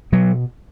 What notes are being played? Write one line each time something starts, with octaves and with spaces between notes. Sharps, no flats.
B2 F#3